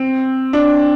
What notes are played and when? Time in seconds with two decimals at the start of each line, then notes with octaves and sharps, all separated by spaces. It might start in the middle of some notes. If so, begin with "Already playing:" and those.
Already playing: C4
0.53 D4